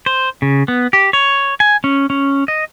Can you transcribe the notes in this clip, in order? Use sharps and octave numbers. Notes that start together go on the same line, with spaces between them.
C5
C#3
B3
G4
C#5
G#5
C#4
C#4
D#5